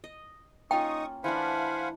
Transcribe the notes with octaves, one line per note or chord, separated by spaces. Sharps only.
D#5
A#3 C#4 D#4 F4 G5 C#6 D#6
E3 A3 D4 C5 F5 F#5 G#5 B5